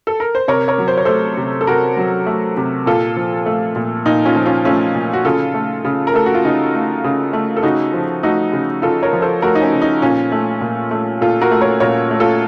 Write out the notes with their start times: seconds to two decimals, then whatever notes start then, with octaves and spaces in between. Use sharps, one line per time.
0.07 A4
0.20 A#4
0.35 C5
0.48 C3 A#4 C#5
0.68 A#4 C#5
0.78 F#3
0.88 C5
0.98 C#5
1.05 A3 A4 C5
1.37 C3
1.61 A4
1.67 C3 F#4 A#4
1.97 F#3
2.26 A3
2.57 C3
2.86 A#2 F4 A4
3.16 F3
3.46 A3
3.76 A#2
4.06 A#2 D#4
4.25 C#4 F4
4.36 F3
4.46 C#4 F4
4.65 A3 C#4 F4
4.95 A#2
5.13 F#4
5.25 C#3 F4 A4
5.54 A3
5.85 C#3
6.07 A#4
6.14 A3 A4
6.26 F#4
6.34 F4
6.45 C#3 D#4
6.74 A3
7.04 C#3
7.33 A3
7.57 A4
7.63 C#3 D#4 F#4
7.93 F3
8.23 A3 D#4 F#4
8.53 C#3
8.82 C#3 F4 A4
9.03 A#4 C#5
9.13 F3
9.22 A4 C5
9.42 A3 F#4 A#4
9.55 D#4
9.62 C#4
9.73 C#3
9.82 D#4
10.02 A#2 C#4 F4
10.32 A3
10.61 A#2
10.91 A3
11.21 A#2 F4 A4
11.41 F#4 A#4
11.51 A3
11.61 A#4 C#5
11.80 A#2 A#4 C#5
12.11 A3
12.20 F4 A4